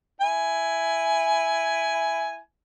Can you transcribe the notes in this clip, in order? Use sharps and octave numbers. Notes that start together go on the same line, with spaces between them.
E4 G#5